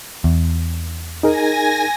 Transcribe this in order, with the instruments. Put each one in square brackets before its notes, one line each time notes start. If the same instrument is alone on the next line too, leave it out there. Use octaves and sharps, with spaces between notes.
[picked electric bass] E2
[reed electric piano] D#4 G#4 A#4 [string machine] G#5 A#6